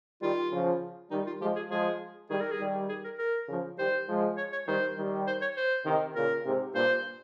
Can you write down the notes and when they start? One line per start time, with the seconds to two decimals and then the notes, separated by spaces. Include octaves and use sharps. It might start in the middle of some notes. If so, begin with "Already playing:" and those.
0.22 D#3 G3 F4
0.52 C#3 F3
1.11 D#3 G3 D#4
1.27 F4
1.41 F3 G#3 G4
1.56 G#4
1.71 F3 G#3 G#4
2.30 D#3 G3 G#4
2.40 A#4
2.52 G#4
2.59 D#3 G3
2.89 G#4
3.04 A#4
3.19 A#4
3.49 C#3 F3
3.78 D#3 G3 C5
4.08 F3 G#3
4.38 C#5
4.52 C#5
4.67 D#3 G3 C5
4.97 D#3 G3
5.27 C5
5.42 C#5
5.57 C5
5.86 C3 D#3
6.16 A#2 C#3 A#4
6.45 G#2 C3
6.75 G2 A#2 C5